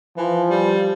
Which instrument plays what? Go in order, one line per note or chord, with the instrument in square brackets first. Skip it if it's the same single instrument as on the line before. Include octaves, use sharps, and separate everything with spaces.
[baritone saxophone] E3 [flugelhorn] F3
[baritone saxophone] G3